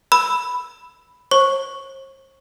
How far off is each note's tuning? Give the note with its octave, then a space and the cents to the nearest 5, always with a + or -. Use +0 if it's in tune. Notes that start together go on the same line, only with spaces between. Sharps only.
B5 +0 E6 +0
C5 +45 C#6 +0